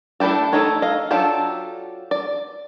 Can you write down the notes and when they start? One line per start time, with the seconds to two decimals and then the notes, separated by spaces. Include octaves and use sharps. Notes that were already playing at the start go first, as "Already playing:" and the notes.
0.20 A3 D4 E4 G4 A4
0.53 A3 D#4 A4 A#4 C#5
0.82 D#5 F5
1.11 F#3 D4 F4 G4 A4
2.11 D5